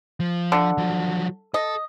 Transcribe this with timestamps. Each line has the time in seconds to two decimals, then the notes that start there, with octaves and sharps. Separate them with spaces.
0.20 F3
0.52 D3
0.78 F3 F#3
1.54 A4 D#5